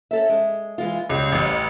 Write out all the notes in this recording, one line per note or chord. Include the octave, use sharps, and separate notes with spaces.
C#4 A4 E5
G#3
E3 G#3 F4
C#2 C#3 G3
A1